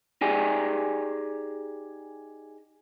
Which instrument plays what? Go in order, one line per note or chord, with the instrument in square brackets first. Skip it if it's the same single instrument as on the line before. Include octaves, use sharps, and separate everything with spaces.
[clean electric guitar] D#4 G4 G#4 D5 G5 G#5